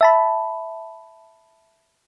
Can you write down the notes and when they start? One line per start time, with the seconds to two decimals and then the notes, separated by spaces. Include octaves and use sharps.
0.01 E5 A5 B5